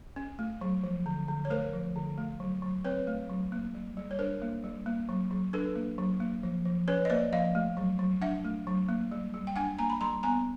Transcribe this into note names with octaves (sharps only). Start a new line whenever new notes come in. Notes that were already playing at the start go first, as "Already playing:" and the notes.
C#4
A3
F#3
F3
D3
D3
C#5
A3 A#4 C5
F3
D3
A3
F#3
F#3
C4 B4 C#5
A3
F#3
A#3
G3
G3
C#5
D4 A#4 C5
A#3
G3
A#3
F#3
F#3
D4 A4 B4
A#3
F#3
A#3
F3
F3
C#4 B4 C#5
D#5
A#3 C5 D5
F3 D#5 F5
A3
F#3
F#3
D4 E5 F#5
A3
F#3
A#3
G3
G3
G5
D4 F#5 G#5
A#3 G#5 A#5
B5
G3 A#5 C6
B3 G#5 A#5